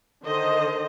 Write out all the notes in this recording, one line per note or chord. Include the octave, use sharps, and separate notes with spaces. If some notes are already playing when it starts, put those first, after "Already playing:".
D3 D#3 C5 D#5